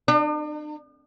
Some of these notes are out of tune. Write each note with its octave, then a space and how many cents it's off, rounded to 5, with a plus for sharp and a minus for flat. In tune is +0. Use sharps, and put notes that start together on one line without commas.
D4 +45